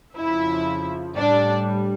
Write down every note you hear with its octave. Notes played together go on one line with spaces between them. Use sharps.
F2 C#3 F3 E4 E5
A2 G3 D4 D5